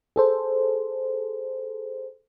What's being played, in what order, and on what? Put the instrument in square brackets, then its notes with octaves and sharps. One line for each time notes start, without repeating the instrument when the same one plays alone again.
[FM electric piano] G#4 A4 C5